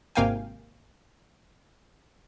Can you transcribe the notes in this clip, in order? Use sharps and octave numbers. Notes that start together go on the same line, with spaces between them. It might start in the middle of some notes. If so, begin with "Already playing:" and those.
G#1 C3 A#3 F5 G5 G#5